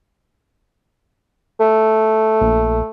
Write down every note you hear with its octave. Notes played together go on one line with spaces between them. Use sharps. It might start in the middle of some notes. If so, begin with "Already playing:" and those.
A3
A#1